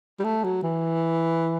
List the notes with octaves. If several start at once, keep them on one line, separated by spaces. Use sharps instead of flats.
G3
A3
F#3
E3